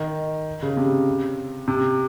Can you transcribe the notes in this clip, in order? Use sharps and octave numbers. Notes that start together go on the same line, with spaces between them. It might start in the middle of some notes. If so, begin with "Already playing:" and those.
Already playing: D#3
C#3
C3
C3